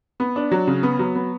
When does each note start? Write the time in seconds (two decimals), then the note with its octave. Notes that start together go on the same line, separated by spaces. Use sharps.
0.20 B3
0.36 D4
0.51 F#3
0.67 C#3
0.83 B3
0.99 F#3
1.15 B3